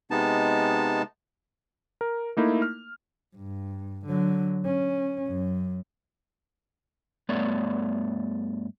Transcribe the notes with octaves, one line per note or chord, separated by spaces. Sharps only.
C3 G#3 B3 D#4 A5
A#4
A3 A#3 D#4 E4
F6
G2
D3 F#3
C#4
F#2
G2 A3 B3 C#5 D5